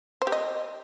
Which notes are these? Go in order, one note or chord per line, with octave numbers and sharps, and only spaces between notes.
C5
G4
D#5